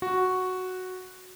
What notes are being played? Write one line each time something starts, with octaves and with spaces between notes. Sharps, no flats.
F#4